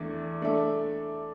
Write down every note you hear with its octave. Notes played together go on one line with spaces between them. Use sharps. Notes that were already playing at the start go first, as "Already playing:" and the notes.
Already playing: E2 E3 A3 D4
A3 D4 A4 E5